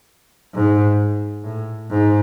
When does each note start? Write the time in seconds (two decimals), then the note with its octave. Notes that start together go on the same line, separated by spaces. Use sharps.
0.54 G#2
1.44 A2
1.90 G#2